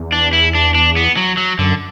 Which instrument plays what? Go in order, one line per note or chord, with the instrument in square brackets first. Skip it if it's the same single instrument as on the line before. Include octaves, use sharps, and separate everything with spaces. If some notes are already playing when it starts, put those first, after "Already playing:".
Already playing: [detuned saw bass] E2
[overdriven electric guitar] D4
E4
D4
D4
B3
F#3
F#3
[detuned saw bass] F#2 [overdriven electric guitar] D3